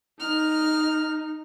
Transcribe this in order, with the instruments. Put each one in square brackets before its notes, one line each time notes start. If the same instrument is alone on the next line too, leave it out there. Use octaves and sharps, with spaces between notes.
[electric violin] D#4 [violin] F6